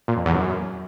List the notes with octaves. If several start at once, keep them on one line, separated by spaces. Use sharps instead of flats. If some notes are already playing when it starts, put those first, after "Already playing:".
A#2
F2
E2
F#2